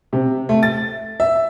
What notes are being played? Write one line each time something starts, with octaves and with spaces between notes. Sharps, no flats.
C3
A3
A6
E5